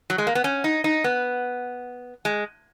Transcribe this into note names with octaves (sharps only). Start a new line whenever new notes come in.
F#3
G#3
A#3
B3
C#4
D#4
D#4
B3
G#3